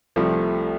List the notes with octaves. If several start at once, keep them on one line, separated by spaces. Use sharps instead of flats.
C2 C3 F3 A3